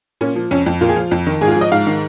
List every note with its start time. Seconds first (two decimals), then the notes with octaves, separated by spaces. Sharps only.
0.21 A#2 C#4
0.36 F3
0.51 F2 C#4
0.66 F2
0.81 A#2 F4
0.89 G#4
0.96 F3 F4
1.11 F2
1.27 D#3
1.41 G#2 G#4
1.48 F4
1.52 G#4
1.56 F3
1.61 D#5
1.72 G#2 F5
1.87 D#3